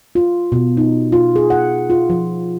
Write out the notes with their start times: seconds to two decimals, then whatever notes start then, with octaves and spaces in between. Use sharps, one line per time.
0.15 F4
0.52 B2
0.77 D#4
1.12 F4
1.36 G#4
1.50 F#5
1.90 F4
2.10 F3